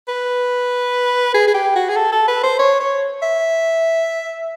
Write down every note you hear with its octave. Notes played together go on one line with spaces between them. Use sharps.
B4
G#4
G#4
G4
F#4
G#4
A4
A4
B4
C5
C#5
C#5
E5